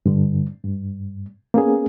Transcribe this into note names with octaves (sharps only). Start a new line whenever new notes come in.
G2 D3
G2
A#3 B3 C#4 G#4